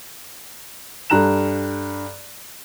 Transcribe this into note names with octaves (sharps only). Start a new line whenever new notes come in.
G2 A4 A#5 F#6 E7